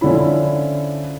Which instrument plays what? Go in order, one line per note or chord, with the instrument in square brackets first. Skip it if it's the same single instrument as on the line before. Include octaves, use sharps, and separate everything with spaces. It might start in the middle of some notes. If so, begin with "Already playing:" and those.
[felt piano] D3 F3 C#4 E4 B5